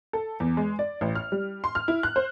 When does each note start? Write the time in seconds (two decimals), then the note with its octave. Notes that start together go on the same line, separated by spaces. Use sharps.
0.13 A4
0.40 E2
0.57 G#3
0.79 D5
1.01 A1
1.15 F6
1.32 G3
1.64 C6
1.75 F6
1.88 E4
2.03 F#6
2.16 C5